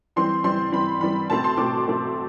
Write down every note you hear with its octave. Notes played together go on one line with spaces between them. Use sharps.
E3 G3 C4 C6
E3 G3 C4 C6
E3 G3 C4 B5
E3 G3 C4 B5
B2 A3 C4 A5
C6
B2 A3 C4 D6
B2 A3 C4